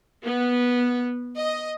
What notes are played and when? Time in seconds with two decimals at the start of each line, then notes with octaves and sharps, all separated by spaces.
0.23 B3
1.36 D#5